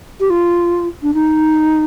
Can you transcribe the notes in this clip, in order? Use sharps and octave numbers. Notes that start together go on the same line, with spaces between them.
G4
F4
D4
D#4